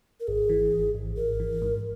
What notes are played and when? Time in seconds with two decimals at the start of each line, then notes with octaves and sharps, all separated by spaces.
0.20 A#4
0.27 G#1 G#4
0.49 E3
0.72 G#1
0.95 G#1
1.17 G#1 A#4
1.40 E3
1.62 G#2